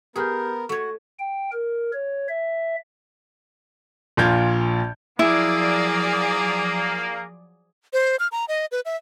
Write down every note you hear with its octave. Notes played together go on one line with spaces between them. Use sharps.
B3 G4 G#4 A#4 B4 F6 G6
A3 F#4 C#5 C#6 G#6
G5
A#4
C#5
E5
A#1 A#2 F4 G6 G#6
F3 F#3 A#3 E4 G#4 D5
C5
F6
A#5
D#5
B4
E5